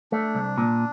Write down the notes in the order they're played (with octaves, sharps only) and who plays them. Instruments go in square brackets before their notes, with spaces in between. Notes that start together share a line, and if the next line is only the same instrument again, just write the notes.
[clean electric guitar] A3 [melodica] D4
[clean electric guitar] C2
A#2